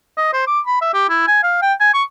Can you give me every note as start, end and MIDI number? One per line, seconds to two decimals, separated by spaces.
0.17 0.33 75
0.33 0.46 72
0.47 0.60 86
0.66 0.79 83
0.81 0.92 76
0.94 1.05 67
1.09 1.23 64
1.27 1.43 80
1.43 1.60 77
1.62 1.73 79
1.81 1.93 80
1.94 2.03 85